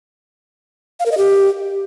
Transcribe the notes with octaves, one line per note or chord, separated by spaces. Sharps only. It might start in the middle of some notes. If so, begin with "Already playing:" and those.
F5
A#4
D#5
G4